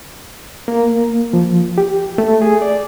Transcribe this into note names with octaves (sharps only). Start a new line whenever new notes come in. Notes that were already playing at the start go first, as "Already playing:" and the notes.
A#3
F3
G4
A3
G#4
D5